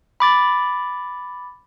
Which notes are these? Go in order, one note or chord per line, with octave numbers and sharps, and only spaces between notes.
B5 D6 A6